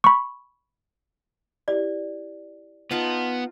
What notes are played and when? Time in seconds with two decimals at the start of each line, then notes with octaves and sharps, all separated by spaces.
0.04 B5 C#6
1.68 E4 G4 D5
2.91 B3 D#4 F4 A5